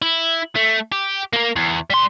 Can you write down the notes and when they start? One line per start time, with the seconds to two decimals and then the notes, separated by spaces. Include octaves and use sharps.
0.02 E4
0.56 A3
0.92 G4
1.33 A#3 A#4
1.56 E2
1.90 G3 C6